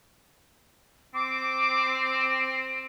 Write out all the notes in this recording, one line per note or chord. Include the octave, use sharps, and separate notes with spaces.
C4 D6